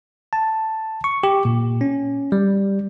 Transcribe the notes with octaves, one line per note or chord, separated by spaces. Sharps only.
A5
C#6
G4
A#2
C#4
G3